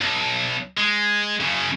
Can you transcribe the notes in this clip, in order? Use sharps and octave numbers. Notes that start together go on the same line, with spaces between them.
B1
G#3
F#2 C#3